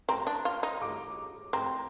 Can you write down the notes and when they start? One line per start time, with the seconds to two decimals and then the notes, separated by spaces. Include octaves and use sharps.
0.09 C4 A#5
0.27 D4
0.45 F4
0.63 D#4
0.82 D6
1.53 C4 A#5